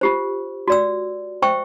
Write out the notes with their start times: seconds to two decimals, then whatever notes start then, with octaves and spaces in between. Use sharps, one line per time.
0.01 F4 G4 C5
0.68 F#4 D5 E6
1.42 C5 E5 G5 C#6 E6